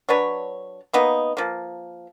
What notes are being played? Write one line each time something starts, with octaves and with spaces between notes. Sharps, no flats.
F#3 D4 B4 C#5
A#3 B3 D#4
F3 A#3